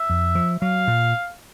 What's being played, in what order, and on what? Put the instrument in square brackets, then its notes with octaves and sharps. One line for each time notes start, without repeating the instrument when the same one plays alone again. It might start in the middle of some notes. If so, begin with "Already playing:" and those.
Already playing: [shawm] E5
[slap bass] F2
F3
[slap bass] F#3 [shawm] F5
[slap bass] A#2